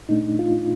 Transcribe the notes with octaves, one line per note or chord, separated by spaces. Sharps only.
A#2 A3 D4 D#4
F4